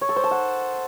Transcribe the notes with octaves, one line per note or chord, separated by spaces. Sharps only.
C#5
A4
C5
A5
F#5